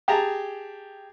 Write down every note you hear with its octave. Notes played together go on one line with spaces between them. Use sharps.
G4 G#4 A5 A#5